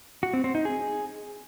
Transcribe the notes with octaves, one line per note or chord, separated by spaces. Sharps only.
F#4
C4
C4
D#4
G#4